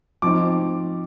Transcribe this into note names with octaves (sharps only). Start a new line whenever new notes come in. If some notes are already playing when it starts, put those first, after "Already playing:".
F3 C4 D#4 D6